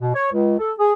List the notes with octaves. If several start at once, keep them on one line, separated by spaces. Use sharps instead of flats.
B2
C#5
C#2
A4
G#4